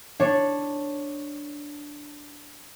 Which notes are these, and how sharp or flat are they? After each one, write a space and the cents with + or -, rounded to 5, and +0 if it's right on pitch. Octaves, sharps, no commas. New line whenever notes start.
D4 +0 C#5 -10